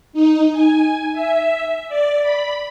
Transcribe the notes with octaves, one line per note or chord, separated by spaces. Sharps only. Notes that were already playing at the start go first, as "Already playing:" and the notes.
D#4
G#5
E5
D5
B5